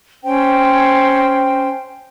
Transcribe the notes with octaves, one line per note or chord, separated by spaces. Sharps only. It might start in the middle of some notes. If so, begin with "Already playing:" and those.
C#4 C5 G5